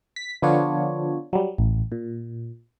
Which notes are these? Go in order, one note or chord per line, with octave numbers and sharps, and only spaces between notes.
B6
D3 F3 B3 D4 F4 C#5
F#3 G3
A1
A#2